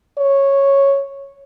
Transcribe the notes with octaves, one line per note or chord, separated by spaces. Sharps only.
C#5